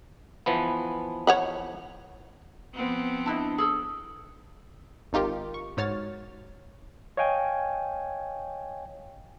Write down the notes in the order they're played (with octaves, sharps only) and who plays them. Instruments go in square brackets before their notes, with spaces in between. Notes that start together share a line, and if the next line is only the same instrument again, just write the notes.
[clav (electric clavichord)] E3 F3 B3
[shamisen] C#5 F#5 B5
[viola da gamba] F3 B3 C4
[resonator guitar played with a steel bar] D4 E4 D#5
G#4 A4
[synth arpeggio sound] G#1 D#4 F4 G4 A#4
C#6
G#2 F#4 C#5 F6 A6
[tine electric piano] C#5 D#5 F5 G5 G#5